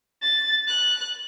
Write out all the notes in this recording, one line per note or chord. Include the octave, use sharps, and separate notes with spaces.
A6
F#6